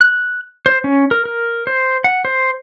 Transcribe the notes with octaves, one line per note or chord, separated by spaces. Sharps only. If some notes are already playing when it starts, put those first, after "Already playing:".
F#6
C5
C#4
A#4
A#4
C5
F#5
C5